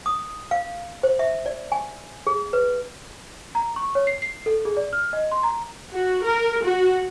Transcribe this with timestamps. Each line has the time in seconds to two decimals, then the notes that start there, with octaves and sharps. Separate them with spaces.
0.06 D#6
0.51 F5
1.03 C5
1.19 E5
1.46 D5
1.72 G#5
2.27 G#4
2.53 B4
3.55 A#5
3.76 C#6
3.95 C#5
4.07 C7
4.22 C7
4.46 A4
4.65 G#4
4.77 D5
4.93 F6
5.13 D#5
5.32 C6
5.43 A#5
5.92 F#4
6.24 A#4
6.64 F#4